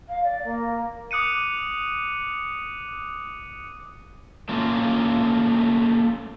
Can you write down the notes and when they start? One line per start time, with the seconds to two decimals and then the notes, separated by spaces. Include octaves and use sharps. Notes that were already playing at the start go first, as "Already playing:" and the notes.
0.08 F5
0.23 D5
0.44 A#3
1.11 D6 D#6 F#6 C#7 D#7
4.49 A3 A#3 C#4 F4